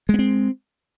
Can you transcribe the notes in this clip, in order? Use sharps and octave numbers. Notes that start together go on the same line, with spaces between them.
G#3 B3 C4